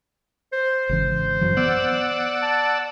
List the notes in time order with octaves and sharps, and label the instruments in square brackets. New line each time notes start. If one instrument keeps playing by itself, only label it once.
[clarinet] C5
[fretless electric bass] G#1 C#3 E3
F#2 E3 F#3
[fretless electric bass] B3 [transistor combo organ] D5 F#5 E6
[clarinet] A5